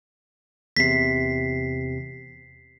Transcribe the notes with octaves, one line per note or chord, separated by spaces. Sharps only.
E2 C3 B6 C7